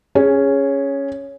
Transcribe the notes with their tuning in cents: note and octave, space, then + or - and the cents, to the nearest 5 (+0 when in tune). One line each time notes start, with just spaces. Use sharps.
C#4 +0 G#4 -10